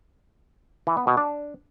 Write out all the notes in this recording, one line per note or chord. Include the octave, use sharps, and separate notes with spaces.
E3
B3
B2
D4